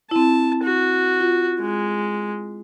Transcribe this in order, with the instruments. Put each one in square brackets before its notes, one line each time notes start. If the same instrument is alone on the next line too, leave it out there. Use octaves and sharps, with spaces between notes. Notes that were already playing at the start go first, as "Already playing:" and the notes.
[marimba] C4 E4 [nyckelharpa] A5
[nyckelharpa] F#4
[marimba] F4
[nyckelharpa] G#3